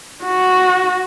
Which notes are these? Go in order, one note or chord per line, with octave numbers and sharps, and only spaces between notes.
F#4